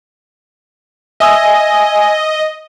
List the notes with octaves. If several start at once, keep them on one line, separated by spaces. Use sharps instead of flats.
D#5 E5 G#5 D#6 E6